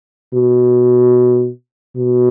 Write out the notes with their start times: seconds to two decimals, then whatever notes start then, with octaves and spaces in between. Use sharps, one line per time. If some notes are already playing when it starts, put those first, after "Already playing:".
0.34 B2
1.97 B2